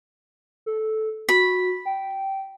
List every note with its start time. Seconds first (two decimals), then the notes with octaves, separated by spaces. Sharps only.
0.66 A4
1.29 F#4 B5
1.85 G5